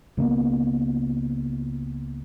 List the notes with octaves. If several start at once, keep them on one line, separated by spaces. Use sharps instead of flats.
C#2 C#3 A#3 B3